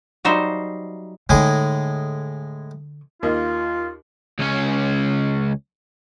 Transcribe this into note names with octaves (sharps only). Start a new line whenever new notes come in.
F#3 G3 D#4 C5 E5
A2 D3 G#3 D#4 G#4
D#2 A#3 F4 D#5
C#2 C#4